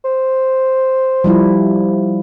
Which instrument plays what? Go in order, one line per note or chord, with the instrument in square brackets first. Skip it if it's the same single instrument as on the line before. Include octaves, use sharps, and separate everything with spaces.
[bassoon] C5
[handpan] F3 G3 E4